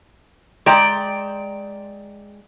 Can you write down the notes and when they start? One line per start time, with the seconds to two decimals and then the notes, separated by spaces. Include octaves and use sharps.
0.66 G#3 D5 G5 A#5